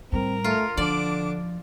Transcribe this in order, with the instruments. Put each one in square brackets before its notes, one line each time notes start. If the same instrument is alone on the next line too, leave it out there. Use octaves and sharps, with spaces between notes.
[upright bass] A2 G3 [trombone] C4 [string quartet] A#4
[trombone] A3 [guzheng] F4
[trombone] D3 [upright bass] F3 [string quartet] D4 D6 [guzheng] D5